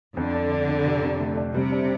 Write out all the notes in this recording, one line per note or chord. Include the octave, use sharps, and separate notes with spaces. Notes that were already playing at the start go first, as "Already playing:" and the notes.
F2 D3
D4
D4
D4
C3
C3
A3
D4
C3 G3
D4